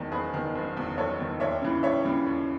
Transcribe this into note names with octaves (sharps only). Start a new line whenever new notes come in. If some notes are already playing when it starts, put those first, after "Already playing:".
Already playing: F#1 E2 D#3 A5
F#1 G#4 B4
E2 D#3
F#1
E2 D#3
F#1 A4 C#5
E2 D#3
D#2 C#5 E5
C#3 E3
D#2 C#5 E5
C#3 E3
D#2